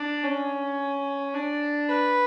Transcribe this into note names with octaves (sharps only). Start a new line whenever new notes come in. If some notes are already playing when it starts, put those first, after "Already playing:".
Already playing: D4
C#4
D4
B4